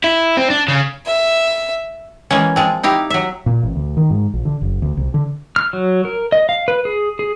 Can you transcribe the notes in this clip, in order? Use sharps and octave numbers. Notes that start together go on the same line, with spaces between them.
E4
C4
D4
C#3
E5
E3 G#3 A#3 C#4
F3 G#3 C4
D#4 E4 G4 F5
F#3 E5
A#2
A1
D2
D#3
G#2
A#1
D3
F#1
D2
C2
D3
F6
F#3
A#4
D#5
F5
B4
G#4
G#4